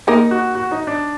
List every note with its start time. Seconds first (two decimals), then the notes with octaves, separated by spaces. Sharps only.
0.07 A#3 D#4 A#4
0.31 F#4
0.55 F#4
0.71 D#4
0.87 D4